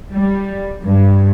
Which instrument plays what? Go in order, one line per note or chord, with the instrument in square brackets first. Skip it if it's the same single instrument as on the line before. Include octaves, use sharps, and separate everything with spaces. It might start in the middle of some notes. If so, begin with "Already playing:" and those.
[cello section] G3
G2